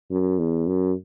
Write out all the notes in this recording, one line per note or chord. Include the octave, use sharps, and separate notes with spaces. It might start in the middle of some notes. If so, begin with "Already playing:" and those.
F#2
E2
F#2